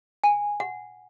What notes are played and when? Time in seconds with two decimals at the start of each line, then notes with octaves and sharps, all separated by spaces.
0.24 G#5
0.60 F#5